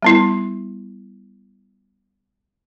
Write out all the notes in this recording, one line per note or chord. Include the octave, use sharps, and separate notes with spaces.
G3 B3 E4